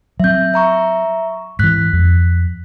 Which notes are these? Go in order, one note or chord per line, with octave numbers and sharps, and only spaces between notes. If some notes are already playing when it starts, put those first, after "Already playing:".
F#3 C4 E5 G6
E5 A#5 C#6
G#2 E3 F#6 B6
F2